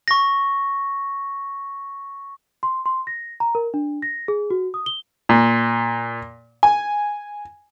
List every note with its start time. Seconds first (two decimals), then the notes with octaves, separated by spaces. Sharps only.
0.08 C#6 A#6
2.63 C6
2.86 C6
3.07 A#6
3.40 A#5
3.55 A#4
3.74 D4
4.02 A#6
4.28 G#4
4.50 F#4
4.74 D#6
4.86 G7
5.29 A#2
6.63 G#5